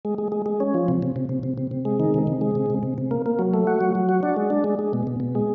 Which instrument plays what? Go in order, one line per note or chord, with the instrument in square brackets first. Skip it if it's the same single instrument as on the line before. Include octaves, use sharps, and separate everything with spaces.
[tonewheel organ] G#3
G#3
G#3
G#3
C#4
F3
C3
C3
C3
C3
C3
C3
C3
G#3
D#3
C3
C3
G#3
C3
C3
C3
C3
A#3
A#3
F#3
A3
F#4
F#3
F#3
F#4
D4
G#3
D4
G#3
G#3
B2
B2
B2
G#3